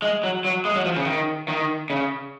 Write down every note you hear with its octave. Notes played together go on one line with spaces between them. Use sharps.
G#3
F#3
F#3
G#3
F#3
F3
C#3
D#3
D#3
C#3